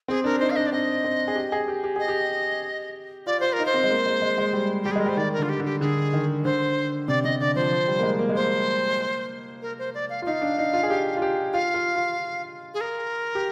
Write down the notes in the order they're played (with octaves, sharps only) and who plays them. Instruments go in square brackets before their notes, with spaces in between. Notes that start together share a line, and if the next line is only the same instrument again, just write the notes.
[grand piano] C4 [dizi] G#4
[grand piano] D4 [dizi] A#4
[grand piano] D#4 [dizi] C5
[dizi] F5
[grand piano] D4 [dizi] D#5
[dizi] D5
[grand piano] C4 [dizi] D#5
[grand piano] C4
G#4
G4
G#4
G4
G4
[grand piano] G#4 [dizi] D#5
[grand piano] G4
[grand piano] F4 [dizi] D5
[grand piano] F4 [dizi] C5
[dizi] A#4
[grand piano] D#4
[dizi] C5
[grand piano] C4
G#3
A#3
G#3
G#3
G#3
G3
[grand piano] G3 [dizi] G4
[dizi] G#4
[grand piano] G#3 [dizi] A#4
[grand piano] G3 [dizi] C5
[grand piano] D#3 [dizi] D5
[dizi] A#4
[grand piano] D3 [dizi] F4
[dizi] G4
[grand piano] D3
[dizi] G4
[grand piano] D3 [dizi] G#4
[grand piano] D#3
[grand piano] D3 [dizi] C5
[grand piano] C3 [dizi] D5
[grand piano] C3 [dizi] D#5
[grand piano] D3 [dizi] D5
[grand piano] F3 [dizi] C5
[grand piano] F3
G3
A#3
G#3
A#3
G#3
[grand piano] A#3 [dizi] C5
[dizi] A#4
C5
D5
F5
[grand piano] F4
[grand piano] D#4 [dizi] F5
[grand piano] D4
D#4
F4
G#4
G4
F4
G4
[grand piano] F4 [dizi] F5
[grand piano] F4
F4
[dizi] G#4
A#4
[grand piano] G4